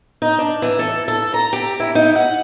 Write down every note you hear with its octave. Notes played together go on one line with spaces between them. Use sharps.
D#4
D4
E3
A4
A4
A#5
G4
E4
D#4
F#5